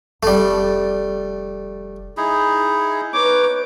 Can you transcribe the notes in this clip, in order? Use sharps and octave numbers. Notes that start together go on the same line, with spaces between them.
F1 G3 A3
D#4 E4 G#4
D#4 B4 C#5 D6